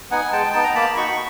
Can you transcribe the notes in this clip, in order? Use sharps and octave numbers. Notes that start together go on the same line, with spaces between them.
B3 D#4 F#5 G#5
G#3 G5 A5
B3 D#4 A5
A#5
A#3 A5 B5
D#4 F#4 B5 C#6